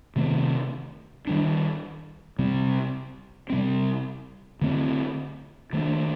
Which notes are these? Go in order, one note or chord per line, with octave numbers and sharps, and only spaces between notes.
C3 D#3 A3 C4
D#3 G3 D4
C3 G3 C4
C3 G3 C4
D3 A3 C4
D#3 A3 D4